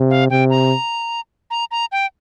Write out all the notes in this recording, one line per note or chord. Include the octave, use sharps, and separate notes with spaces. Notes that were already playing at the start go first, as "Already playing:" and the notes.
Already playing: C3
F5
C3 G5
A#5
A#5
A#5
G5